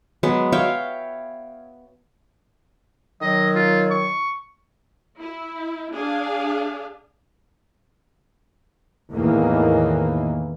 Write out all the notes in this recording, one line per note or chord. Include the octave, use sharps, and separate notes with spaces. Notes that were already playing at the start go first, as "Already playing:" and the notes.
F#3 G#3 B3
C#5 E5 F5 G5
D#3 F#3 D#5
F4
C#6
E4
D4 G#4 F5
E2 A2 D#3 E3 A#3